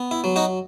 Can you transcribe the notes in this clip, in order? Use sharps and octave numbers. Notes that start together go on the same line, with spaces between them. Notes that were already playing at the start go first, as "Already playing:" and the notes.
Already playing: B3
E4
F#3
D#4 F#4